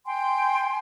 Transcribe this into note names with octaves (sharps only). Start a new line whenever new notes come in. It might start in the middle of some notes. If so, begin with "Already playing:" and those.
G5 G#5 C6